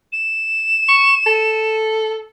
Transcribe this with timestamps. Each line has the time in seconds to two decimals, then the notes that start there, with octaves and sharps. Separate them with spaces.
0.12 E7
0.89 C#6
1.26 A4